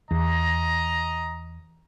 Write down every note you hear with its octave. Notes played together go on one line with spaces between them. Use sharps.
E2 D#5 A#5